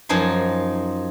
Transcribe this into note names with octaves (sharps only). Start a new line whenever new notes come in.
F#2 F3 D#4 G#5 C6